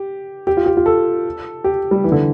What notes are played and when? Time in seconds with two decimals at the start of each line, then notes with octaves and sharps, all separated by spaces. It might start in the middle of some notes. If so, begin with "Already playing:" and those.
Already playing: G4
0.47 G4
0.57 F4
0.66 G4
0.77 F4
0.86 A4
1.64 G4
1.91 G3
2.04 E3
2.12 D3